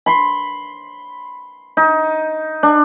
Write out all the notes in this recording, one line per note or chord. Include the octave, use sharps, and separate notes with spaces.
B5 C6
D#4
D4